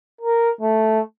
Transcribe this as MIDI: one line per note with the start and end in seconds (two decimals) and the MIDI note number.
0.21 0.50 70
0.61 1.00 57